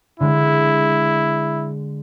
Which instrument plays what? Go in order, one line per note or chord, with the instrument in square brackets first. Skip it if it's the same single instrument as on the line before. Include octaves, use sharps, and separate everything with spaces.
[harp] D3 G#3 [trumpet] E4